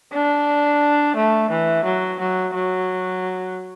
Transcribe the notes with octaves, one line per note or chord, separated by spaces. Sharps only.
D4
A3
E3
F#3
F#3
F#3